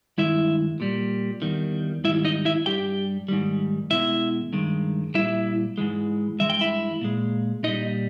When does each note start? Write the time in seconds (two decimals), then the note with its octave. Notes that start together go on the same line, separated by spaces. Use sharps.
0.18 G2 D#3 G#3 E4 E5
0.80 A#2 G3
1.42 E2 D#3 G3
2.04 G#2 D#3 G3 E4 E5
2.25 D#4 D#5
2.45 E4 E5
2.66 G2 G3 G4 G5
3.28 G#2 D#3 G3
3.91 E2 B2 G#3 E4 E5
4.53 G2 D#3 G#3
5.14 A#2 G3 E4 E5
5.78 G#2 E3 G#3
6.39 G2 E3 G#3 E5
6.50 G5
6.61 E4 E5
7.01 A#2 G#3
7.63 A#2 G3 D#4 D#5